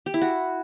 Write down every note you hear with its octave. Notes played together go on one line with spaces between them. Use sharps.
G4
E4
F#4